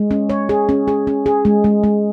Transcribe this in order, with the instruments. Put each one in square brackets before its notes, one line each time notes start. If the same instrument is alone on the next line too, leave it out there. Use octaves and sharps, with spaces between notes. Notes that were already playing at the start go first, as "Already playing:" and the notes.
Already playing: [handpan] G#3
C#4
C#5
G#4
C#4
G#4
C#4
G#4
G#3
G#3
G#3